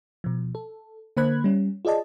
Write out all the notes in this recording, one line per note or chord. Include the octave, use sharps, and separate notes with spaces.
B2 F3
A4
D3 A#3 C5 B5 F#6 G#6
G3 C#4
F4 G#4 D5 D#5 A5